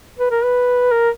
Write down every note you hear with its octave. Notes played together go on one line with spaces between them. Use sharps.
B4
A#4
B4
A#4